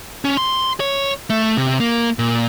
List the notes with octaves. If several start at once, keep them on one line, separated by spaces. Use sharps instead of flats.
C#4
C6
C#5
A3
C3
A#3
A#2